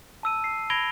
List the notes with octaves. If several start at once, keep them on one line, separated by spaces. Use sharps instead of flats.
A5 E6 D#7
C7
B5 G#6 A#6 D7 F7 G7